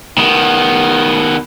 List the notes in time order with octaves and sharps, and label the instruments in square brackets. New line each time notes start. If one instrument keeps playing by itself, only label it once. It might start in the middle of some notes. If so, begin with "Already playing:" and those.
[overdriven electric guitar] D#3 B3